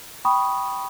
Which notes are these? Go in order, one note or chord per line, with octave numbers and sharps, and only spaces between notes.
G5 B5 C#6 D#6